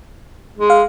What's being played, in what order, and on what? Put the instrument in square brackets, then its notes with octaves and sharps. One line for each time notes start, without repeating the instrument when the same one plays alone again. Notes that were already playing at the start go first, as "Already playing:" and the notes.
[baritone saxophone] G#3
[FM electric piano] F5